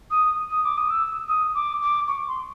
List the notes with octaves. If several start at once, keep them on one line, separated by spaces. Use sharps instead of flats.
D#6
D#6
D6
D#6
E6
D#6
D6
D6
C#6
C6